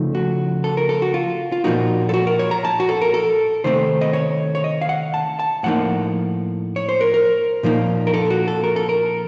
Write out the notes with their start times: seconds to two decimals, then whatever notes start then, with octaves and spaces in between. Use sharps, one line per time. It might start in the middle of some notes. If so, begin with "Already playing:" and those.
Already playing: C#3 F3 A3 D#4
0.15 F#4
0.64 A4
0.77 A#4
0.89 A4
1.02 F#4
1.14 F4
1.52 F4
1.64 A#2 F3 A#3 D#4 F#4
2.09 A4
2.14 F#4
2.27 A#4
2.39 C#5
2.51 A#5
2.65 A5
2.80 F#4
2.89 A4
3.02 A#4
3.14 A4
3.64 C3 D#3 A3 C4 C5
4.01 D#5
4.13 C#5
4.55 C#5
4.64 D#5
4.81 F5
4.89 F#5
5.14 A5
5.39 A5
5.63 A2 F3 A#3 D#4 F#5
6.76 C#5
6.89 C5
7.01 A#4
7.14 A#4
7.63 A#2 F3 A#3 D#4
8.07 A#4
8.14 A4
8.30 F#4
8.48 A4
8.64 A#4
8.76 A4
8.89 A#4